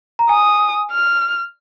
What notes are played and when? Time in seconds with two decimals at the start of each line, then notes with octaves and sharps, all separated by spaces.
0.19 A#5
0.29 G#5 D#6
0.92 F6